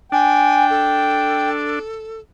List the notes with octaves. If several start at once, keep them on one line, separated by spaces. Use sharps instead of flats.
D4 G5 G#5
A4